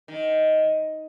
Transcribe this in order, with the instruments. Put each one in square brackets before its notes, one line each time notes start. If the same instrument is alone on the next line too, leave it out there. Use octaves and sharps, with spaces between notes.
[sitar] D#3